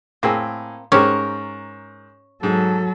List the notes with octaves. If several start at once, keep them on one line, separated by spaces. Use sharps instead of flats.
A2 A#3 C4 G#4
G#2 C#4 G4 A#4 C5 C#5
G#2 F#3 A4